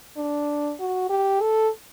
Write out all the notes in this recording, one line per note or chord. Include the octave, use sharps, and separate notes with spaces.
D4
F#4
G4
A4